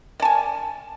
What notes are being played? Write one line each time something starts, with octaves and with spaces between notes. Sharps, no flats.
D5 G#5 A5